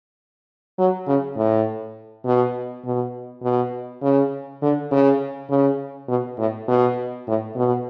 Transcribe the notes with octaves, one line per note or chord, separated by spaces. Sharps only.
F#3
C#3
A2
B2
B2
B2
C#3
D3
C#3
C#3
B2
A2
B2
A2
B2